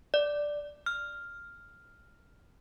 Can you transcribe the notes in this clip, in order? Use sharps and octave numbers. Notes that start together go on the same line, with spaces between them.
D5
F6